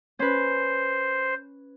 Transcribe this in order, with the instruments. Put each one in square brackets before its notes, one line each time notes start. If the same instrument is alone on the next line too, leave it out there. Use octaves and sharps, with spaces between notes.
[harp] C#4 B4 [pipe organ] C5